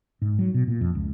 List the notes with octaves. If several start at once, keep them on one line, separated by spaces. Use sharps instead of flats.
G#2
F#3
B2
A#2
F2
C#2